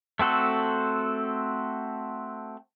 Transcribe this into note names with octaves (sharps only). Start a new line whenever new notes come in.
A3 C4 F#4 A4